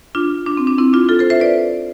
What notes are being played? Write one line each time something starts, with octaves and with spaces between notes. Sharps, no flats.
D4 F4
D4
C4
D4
C4 E4
D4 F4
F4 A4
A4 C5
C5 E5
B4 D5